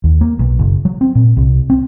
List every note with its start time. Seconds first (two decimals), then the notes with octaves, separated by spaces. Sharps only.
0.04 D#2
0.21 A#3
0.39 B1
0.59 F#1
0.85 F#3
1.01 C4
1.15 A#2
1.37 C2
1.70 C4